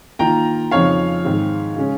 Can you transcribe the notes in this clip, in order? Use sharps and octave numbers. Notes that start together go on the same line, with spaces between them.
D#3 A#3 F4 G5 A#5
F2 C#3 F3 C4 D#4 C#5 F5
G#2 D#3 G#3 C4
C#3 G#3 C#4